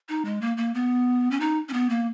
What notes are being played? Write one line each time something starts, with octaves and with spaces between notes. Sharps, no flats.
D#4
G#3
A#3
A#3
B3
C#4
D#4
C#4
B3
A#3